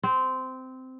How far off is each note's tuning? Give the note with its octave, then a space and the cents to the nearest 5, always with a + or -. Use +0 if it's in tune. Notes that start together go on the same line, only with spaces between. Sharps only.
C4 -15